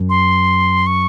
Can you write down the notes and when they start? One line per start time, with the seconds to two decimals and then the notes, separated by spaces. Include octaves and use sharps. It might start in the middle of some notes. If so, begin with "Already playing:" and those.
Already playing: F#2
0.10 C6
0.87 C#6